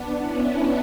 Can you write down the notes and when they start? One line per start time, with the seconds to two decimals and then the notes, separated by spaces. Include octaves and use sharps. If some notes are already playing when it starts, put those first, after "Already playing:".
Already playing: B3 D4
0.18 C#4 E4